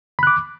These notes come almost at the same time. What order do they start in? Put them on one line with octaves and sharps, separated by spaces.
B5 F#6 D6